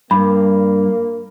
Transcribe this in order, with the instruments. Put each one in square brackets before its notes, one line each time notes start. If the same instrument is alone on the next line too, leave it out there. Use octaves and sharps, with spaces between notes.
[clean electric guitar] G2 [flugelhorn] A#3 [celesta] B5